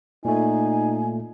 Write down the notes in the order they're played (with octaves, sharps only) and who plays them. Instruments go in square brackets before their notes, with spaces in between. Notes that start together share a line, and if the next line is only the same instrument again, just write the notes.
[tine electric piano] A#2 A3 [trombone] D#4 [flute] G#5